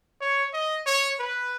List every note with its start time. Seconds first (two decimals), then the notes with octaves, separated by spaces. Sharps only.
0.21 C#5
0.53 D#5
0.86 C#5
1.19 B4